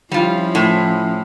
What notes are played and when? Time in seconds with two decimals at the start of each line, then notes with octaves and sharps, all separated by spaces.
0.12 F3 G3 C#4 E4 F4
0.55 A2